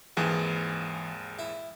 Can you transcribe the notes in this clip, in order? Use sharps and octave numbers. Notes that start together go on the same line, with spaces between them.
G#1 D#2 E3 G#4
E4